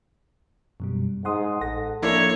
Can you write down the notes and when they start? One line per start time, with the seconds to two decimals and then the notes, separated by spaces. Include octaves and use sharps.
0.80 F#2 B2 G3
1.25 G#2 F#5 C6 D#6
1.61 A1 A4 F#5 A#6
2.03 F3 A#3 D4 E4 C#5